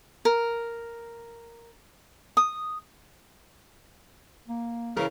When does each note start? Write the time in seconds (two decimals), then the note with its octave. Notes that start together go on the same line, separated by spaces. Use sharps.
0.25 A#4
2.37 D#6
4.48 A#3
4.97 C#3 E3 A#4